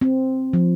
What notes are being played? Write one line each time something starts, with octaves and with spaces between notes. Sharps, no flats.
C4
F3